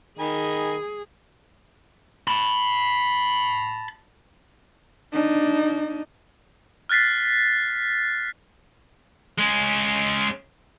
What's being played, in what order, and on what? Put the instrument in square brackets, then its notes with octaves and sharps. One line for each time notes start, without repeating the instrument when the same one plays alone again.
[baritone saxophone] D#3 [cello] G#4 [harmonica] D#5 G#5 B5
[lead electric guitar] A5 B5
[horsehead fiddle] D4 D#4
[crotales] F6 F#6 A6 B6 C7
[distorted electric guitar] G#3 C#4